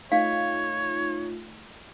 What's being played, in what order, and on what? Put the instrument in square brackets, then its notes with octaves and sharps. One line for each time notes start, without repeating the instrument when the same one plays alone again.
[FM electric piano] A3 D#4 F4 [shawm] C#5 [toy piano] F5